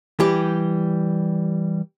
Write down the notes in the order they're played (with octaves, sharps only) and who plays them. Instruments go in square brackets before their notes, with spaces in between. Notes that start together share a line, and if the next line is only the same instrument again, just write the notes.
[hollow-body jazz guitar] E3 G3 G4